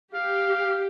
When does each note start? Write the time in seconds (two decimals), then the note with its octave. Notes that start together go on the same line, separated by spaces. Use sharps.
0.14 G4 F5